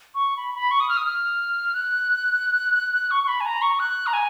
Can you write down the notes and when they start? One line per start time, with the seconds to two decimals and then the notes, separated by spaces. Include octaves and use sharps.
0.15 C#6
0.37 B5
0.55 B5
0.71 C#6
0.80 D#6
0.89 F6
0.97 D#6
1.06 F6
1.74 F#6
3.11 C#6
3.23 C#6
3.28 B5
3.41 G#5
3.46 A#5
3.62 C#6
3.80 F#6
4.07 A#5
4.13 G#5